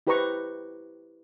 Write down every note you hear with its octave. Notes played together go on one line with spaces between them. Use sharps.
E4 G4 B4 C5 A#5 C#6